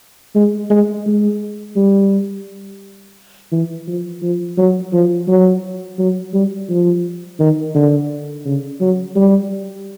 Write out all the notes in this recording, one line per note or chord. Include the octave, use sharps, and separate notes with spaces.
G#3
G#3
G#3
G3
E3
F3
F3
F#3
F3
F#3
F#3
G3
F3
D#3
D3
C#3
F#3
G3